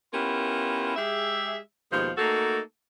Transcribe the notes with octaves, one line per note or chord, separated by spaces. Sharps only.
B3 C#4 E4 F4 G4 A#4
G#3 G4 G#4 E5
D#2 B2 F3 G#3 C5
A3 A#3 D#4 F#4 A4